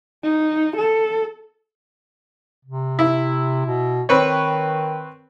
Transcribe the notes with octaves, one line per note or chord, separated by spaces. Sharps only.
D#4
A4
C3
E4
B2
D#3 C4 B4 C#5